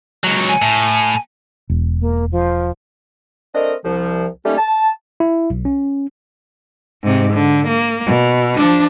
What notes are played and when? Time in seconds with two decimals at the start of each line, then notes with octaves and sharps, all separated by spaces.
0.24 C#2 F#3
0.48 G#5
0.62 A2
1.70 E1
2.00 A#3
2.32 F3
3.55 A3 C4 D4 A#4 D#5
3.85 C2 F3
4.46 D#3 G3 A3 A#3 C#4 D#4
4.58 A5
5.20 E4
5.50 B1
5.65 C#4
7.03 G#2 C3
7.34 D3
7.68 A#3
8.06 B2
8.57 F3 D4